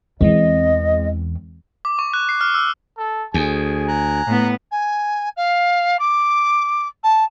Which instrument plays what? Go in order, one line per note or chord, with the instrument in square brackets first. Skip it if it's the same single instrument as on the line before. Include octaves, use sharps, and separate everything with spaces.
[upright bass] E2 [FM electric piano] E3 G#3 C4 [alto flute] D#5
[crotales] D6
C#6
F#6
C7
F6
E6
[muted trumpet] A4
[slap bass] D2 [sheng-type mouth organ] G#4 [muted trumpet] G#5
[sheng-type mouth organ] A#5 F#6
[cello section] A2 B3
[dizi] G#5
F5
D6
A5